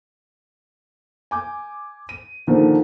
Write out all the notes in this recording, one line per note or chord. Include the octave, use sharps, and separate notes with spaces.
G#5 D6 G6
D#7
A#2 D3 D#3 F3 A#3